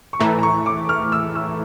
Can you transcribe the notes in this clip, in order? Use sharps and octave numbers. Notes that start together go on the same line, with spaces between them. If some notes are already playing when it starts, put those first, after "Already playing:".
C#6
A2 E3 A3 A#5
A#5
C#6
D6
F6
E6
E6